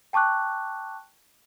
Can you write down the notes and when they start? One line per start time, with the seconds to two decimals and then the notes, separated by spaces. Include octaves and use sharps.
0.13 G5 A5 C#6 D6 F#6